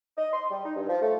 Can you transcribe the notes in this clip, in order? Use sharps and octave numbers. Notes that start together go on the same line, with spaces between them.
D#5
C6
G3
D#4
G2
F3
A3